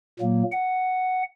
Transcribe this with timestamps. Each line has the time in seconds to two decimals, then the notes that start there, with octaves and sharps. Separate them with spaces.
0.19 A#2 F#3 A#3
0.52 F#5